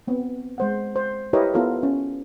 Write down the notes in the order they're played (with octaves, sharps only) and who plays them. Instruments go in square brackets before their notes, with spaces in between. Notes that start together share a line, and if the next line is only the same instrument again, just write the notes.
[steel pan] B3 C4
G#3 C5 F#5
C5
E4 G4 A#4 B4 C#5 D#5
B3 E4 F4 A4 A#4
C#4